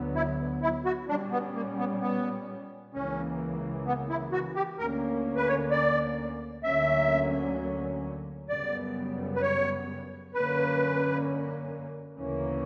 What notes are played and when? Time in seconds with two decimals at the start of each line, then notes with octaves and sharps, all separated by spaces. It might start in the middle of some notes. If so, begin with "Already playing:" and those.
Already playing: D2 D3 F#3 B3
0.15 E4
0.62 E4
0.85 F#4
1.08 A#2 G3 C#4 D4
1.32 B3
1.55 A#3
1.78 B3
2.01 B3
2.94 C#2 C#3 E3 A#3 C#4
3.86 B3
4.10 E4
4.32 F#4
4.56 G4
4.79 D2 D3 A#3 C#4 A#4
5.36 B4
5.48 C#5
5.71 D5
6.64 D2 D3 F#3 A#3 C#4 E5
8.49 F#2 C#3 G3 B3 D5
9.36 B4
9.42 C#5
10.34 F#2 D3 A#3 C#4 B4
12.19 D2 C#3 E3 A#3 C#4